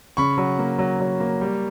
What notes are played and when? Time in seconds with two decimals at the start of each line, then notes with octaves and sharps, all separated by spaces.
0.17 C#3 B5 C#6
0.37 F#3
0.59 A#3
0.78 F#3
1.00 F#3
1.20 A#3
1.41 G3